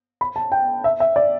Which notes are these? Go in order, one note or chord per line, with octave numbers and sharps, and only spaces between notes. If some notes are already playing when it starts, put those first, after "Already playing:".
B5
A5
G5
E5
E5
D5